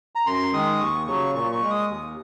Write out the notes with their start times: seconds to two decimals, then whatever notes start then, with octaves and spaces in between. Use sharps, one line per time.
0.15 A#5
0.26 F#2 C6
0.53 D#3 G#3 D#6
0.81 D#2 C#6
1.07 C#3 F#3 C#6
1.34 A#2 C#6
1.52 C#6
1.62 G#3
1.71 D#6
1.88 D#2